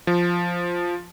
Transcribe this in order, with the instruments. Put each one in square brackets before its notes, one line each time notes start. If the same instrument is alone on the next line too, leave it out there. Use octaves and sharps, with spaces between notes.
[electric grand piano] F3